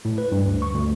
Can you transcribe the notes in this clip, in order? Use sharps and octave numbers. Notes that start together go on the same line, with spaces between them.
A2
B4
G2
D2
C#6
D2